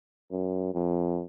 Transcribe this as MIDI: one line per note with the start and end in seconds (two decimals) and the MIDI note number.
0.32 0.74 42
0.74 1.24 41